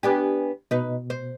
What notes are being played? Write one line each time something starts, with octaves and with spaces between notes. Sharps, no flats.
B3 D4 G4 G#5
B2 D#4 B4
C5